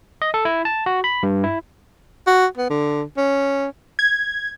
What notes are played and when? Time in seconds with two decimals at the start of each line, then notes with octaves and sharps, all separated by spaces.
0.22 D#5
0.34 A4
0.45 E4
0.65 A5
0.86 F#4
1.04 B5
1.23 G2
1.44 E4
2.27 F#4
2.57 B3
2.70 D3
3.17 C#4
3.99 G#6